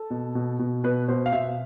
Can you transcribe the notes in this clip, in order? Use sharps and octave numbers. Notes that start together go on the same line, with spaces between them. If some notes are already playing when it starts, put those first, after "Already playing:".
Already playing: A4
B2
B2
B2
B2 B4
B2 C5
F5
B2 E5